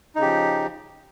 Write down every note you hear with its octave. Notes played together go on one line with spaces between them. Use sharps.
C#3 F3 D#4 G4